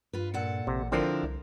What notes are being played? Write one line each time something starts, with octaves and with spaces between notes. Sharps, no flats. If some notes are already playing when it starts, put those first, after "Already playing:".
G2 F4 B4
A#2 A4 F#5
A1 C3
D3 F3 C4 D4 E4 A#4
C2